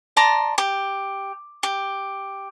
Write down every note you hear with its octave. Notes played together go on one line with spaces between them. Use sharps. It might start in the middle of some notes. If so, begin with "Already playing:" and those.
D5 A5 A#5 C6
G4
G4